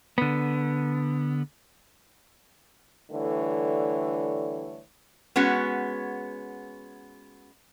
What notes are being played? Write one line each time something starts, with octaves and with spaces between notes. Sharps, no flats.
D3 B3
D3 E3 G3 A3 C#5
G#3 B3 C#4 F#4